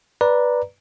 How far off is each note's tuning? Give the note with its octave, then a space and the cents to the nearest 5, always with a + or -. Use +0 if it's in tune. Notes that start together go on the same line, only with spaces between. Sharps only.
B4 -10 D5 +0 A#5 +0